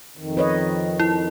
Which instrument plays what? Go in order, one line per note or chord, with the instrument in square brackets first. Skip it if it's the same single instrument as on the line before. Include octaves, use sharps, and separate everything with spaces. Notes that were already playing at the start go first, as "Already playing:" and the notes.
[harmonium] F2 D#3
[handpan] B4 C#5 D#5
[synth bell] E4